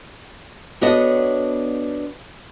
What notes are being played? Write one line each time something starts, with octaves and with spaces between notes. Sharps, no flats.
B3 D4 F#4 A4 C#5 D#5